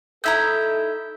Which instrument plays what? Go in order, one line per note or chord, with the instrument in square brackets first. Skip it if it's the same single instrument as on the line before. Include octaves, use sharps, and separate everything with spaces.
[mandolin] D#4 E4 A#5 [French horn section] A4 [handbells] E5 E6 G6